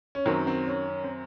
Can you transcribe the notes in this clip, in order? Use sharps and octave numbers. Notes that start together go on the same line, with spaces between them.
C#4
F#2 D#3 F#3 C4
C4
C#4
C#4
C4